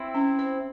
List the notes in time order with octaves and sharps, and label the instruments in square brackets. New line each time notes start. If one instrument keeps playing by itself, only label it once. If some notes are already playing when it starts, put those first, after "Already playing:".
Already playing: [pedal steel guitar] C4 E4
[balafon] C#4
C5